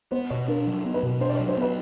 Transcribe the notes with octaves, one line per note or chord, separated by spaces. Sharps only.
B3 C5
B2 C#5
D4 A#4
F#3
B3
B4
B2
D4 C5
D5
C#5
F#3
C5
B3 B4